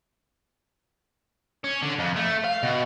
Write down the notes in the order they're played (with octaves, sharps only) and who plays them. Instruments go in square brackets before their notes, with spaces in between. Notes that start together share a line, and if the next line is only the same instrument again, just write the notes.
[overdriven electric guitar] C#4
D3
F2
A3
F5
B2